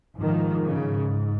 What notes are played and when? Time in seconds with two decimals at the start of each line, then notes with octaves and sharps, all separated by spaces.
0.19 G#2 D#3 F3
0.67 C#3